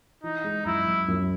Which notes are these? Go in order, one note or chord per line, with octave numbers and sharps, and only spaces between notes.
E3 D#4
G#3
F#2 E4
F#2
F#2